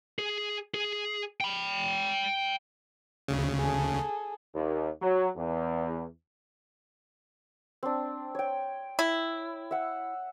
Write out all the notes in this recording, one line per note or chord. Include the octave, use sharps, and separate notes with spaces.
G#4
G#4
G5 B5
D2 C#3
G#4 A4
D#2
F#3
E2
C4 D4
C#5 G5
E4
E5 F#5